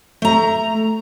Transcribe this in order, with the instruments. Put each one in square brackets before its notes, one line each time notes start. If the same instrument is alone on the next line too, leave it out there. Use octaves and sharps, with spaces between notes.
[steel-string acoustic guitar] A3 A#5